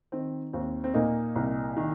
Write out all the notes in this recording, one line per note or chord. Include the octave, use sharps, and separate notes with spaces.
D#3 C4
D#2 C4
C4
A#2 A#3 D#4
C2
D#3